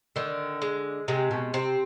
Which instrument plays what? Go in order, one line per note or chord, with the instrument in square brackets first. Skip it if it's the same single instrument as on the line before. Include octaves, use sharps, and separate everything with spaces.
[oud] D3 [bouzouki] D#3
[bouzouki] G#3
[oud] C3 [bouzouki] G#3
[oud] B2
[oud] C3 [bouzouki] C4